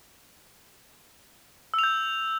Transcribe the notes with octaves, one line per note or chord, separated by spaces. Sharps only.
E6 G6 F7